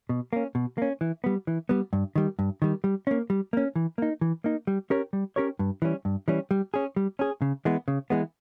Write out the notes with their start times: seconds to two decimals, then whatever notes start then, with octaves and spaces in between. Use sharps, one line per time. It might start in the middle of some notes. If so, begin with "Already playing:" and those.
0.09 B2
0.33 A#3 C#4
0.55 B2
0.78 A#3 C#4
1.01 E3
1.24 G3 B3
1.47 E3
1.69 G3 B3
1.93 G2
2.15 D#3 G3
2.39 G2
2.62 D#3 G3
2.84 G3
3.07 A#3 C#4
3.30 G3
3.53 A#3 C#4
3.76 E3
3.98 A#3 D#4
4.21 E3
4.44 A#3 D#4
4.67 G3
4.90 C#4 G4 A#4 C#5
5.13 G3
5.36 C#4 G4 A#4 C#5
5.59 G2
5.82 E3 G3 C#4
6.05 G2
6.28 E3 G3 C#4
6.51 G3
6.74 C#4 G#4
6.96 G3
7.19 C#4 G#4
7.42 C#3
7.65 E3 G#3 B3
7.88 C#3
8.10 E3 G#3 B3